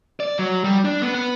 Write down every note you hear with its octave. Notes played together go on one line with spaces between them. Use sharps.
D5
F#3
G3
D4
B3
B3